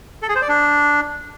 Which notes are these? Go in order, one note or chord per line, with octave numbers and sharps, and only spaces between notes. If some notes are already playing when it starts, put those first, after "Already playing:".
A4
G#4
C5
D5
D4